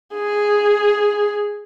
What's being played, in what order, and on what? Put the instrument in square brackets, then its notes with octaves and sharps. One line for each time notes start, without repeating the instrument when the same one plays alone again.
[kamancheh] G#4